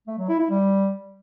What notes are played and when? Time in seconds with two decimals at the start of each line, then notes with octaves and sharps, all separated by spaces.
0.07 A3
0.18 F#3
0.29 E4
0.39 E4
0.50 G3